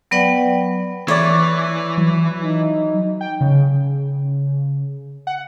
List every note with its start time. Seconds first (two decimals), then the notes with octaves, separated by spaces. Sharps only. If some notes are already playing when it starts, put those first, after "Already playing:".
0.11 F#3 B3 B4 D5 F#5 G5
1.08 E3 E4 C#5 D5
1.98 F#3
2.44 D#4
3.21 G5
3.41 C#3
5.27 F#5